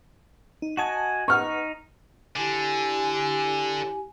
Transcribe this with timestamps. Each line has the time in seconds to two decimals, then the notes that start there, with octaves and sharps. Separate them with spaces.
0.62 D#4
0.77 F#4 D#5 F#5 G#5 A5
1.28 D#4 B4 F#5 C#6 F6
2.36 D3 E4 G4 G#5